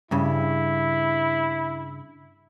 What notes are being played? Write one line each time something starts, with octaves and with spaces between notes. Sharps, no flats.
G2 C#3 E4